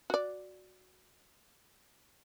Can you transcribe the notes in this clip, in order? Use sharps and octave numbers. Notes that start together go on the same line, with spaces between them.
F#4 D5